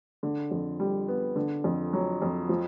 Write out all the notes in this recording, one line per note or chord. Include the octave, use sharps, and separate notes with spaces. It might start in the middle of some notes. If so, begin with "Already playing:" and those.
D3
F2
G3
B3
D3
F2
F#3
F2
F3